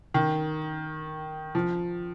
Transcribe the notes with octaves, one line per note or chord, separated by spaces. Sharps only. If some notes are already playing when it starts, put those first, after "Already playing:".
D#3
F3